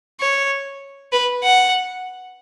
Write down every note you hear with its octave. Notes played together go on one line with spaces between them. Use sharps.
C#5
B4
F#5